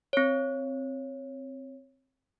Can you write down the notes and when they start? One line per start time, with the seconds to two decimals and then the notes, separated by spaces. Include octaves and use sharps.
0.13 C4 C#5